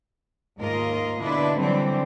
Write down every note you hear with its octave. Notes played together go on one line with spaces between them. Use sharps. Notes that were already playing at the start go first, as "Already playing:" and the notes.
D#2 G#2 A#3 F4 A#4 D#5
B2 D3 D4 E4 B4
D3 E3 F#3 G3 C4